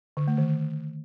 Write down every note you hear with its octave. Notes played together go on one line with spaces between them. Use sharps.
D3
A3
D#3